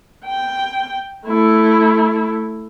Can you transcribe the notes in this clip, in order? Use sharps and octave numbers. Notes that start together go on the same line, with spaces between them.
G5
A3 E4